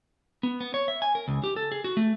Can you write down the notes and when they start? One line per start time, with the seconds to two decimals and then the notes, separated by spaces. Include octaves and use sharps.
0.43 B3
0.60 B3
0.74 C#5
0.88 E5
1.02 G#5
1.15 A#4
1.28 C#2
1.44 G4
1.56 A4
1.72 G#4
1.84 F#4
1.97 A3